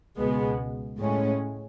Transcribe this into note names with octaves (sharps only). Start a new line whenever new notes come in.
C#2 B2 G#3 B3
A2 G#3 C#4